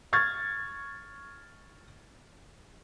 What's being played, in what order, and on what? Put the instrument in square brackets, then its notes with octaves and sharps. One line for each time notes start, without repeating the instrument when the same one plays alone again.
[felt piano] C#6 F6 G#6 A6